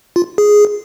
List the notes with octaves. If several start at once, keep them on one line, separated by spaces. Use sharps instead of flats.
F4
G#4